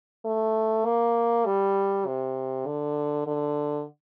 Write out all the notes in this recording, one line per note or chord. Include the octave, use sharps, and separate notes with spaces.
A3
A#3
G3
C3
D3
D3